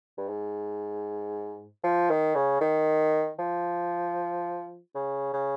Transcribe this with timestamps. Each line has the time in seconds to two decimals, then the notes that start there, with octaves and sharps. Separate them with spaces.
0.17 G2
0.28 G#2
1.84 F3
2.10 D#3
2.35 C#3
2.61 D#3
3.39 F3
4.95 C#3
5.33 C#3